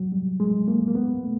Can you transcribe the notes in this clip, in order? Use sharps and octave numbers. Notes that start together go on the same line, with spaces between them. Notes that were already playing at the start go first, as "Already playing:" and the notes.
Already playing: F#3
G3
G#3
A#3
A#3
B3
A3